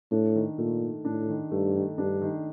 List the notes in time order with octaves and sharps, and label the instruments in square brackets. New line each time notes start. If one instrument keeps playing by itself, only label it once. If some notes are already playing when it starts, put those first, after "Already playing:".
[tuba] A2 [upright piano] D4
[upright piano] D#3
[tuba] A#2 [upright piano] A3
[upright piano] D#3
[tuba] A2 [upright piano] D4
[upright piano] D#3
[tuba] G2 [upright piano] A3
[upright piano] D#3
[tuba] G2 [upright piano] D4
[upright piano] D#3